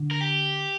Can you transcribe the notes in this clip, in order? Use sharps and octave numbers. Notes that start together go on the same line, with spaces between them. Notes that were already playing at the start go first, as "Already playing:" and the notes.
Already playing: D3
A#4
G4